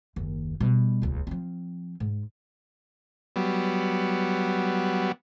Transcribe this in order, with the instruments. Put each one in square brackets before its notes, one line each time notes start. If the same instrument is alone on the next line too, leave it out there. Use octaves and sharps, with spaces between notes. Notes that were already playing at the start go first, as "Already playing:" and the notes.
[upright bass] F#1 D#2
B2 G3
D#1 C#2
F3 C4
G#2
[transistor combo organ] F#3 G3 B3